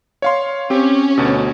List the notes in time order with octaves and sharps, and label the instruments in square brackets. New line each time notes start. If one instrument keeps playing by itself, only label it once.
[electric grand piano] C#5 F5 C6
[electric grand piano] C4 G4 [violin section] C#4
[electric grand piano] D2 B2